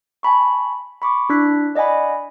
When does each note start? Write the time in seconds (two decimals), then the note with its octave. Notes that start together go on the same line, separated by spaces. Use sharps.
0.23 G#5 A5 B5 C#6
1.02 B5 C#6 D6
1.30 D4 E4 F#6 B6
1.75 D5 D#5 F#5 G#5 B5